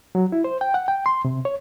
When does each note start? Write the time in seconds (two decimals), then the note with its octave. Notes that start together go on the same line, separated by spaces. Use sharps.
0.15 F#3
0.32 E4
0.44 C5
0.61 G5
0.74 F#5
0.88 G5
1.06 C6
1.25 C3
1.45 C#5